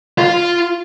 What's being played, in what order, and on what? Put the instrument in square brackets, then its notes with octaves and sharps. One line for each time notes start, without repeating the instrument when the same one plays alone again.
[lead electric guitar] F4